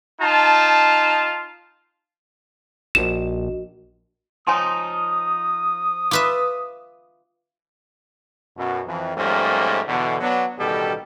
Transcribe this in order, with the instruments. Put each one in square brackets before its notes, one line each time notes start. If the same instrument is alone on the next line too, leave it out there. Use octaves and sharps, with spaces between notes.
[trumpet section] D#4 F4 A5
[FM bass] A#1 [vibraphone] F#4 D#5 [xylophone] E7
[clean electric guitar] F3 D#4 [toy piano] C#5 G#5 C6 [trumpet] D#6
[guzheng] F4 B4 E5 [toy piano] D6
[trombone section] F#2 B2
F2 E3
G#2 F3 G3 A3 A#3 C#4
E2 B2 D3
F#3 B3 D4
A1 B2 D#3 G3 G4 A4